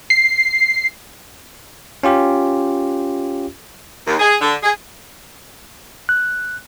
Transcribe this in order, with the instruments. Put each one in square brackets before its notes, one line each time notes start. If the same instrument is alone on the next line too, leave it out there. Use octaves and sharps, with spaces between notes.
[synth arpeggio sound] C7
[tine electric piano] C#4 F4 G4
[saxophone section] D#2
G#4
D3
G#4
[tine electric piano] F#6